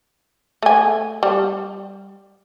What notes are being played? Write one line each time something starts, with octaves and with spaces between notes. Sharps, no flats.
A3 G#5
G3